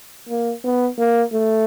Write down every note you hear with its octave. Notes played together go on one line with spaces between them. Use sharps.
A#3
B3
A#3
A3